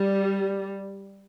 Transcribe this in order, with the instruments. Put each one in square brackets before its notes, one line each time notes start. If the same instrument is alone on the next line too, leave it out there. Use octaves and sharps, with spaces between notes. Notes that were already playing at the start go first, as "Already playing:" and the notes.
Already playing: [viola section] G3